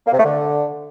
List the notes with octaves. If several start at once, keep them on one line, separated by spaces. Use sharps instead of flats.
A#3
C3
A3
D3